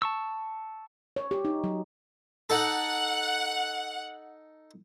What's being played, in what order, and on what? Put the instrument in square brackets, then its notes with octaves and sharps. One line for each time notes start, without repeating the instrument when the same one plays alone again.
[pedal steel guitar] A5 C#6 E6
[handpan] C#5
G4
D#4
F#3
[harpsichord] D#4 A4 [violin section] F#5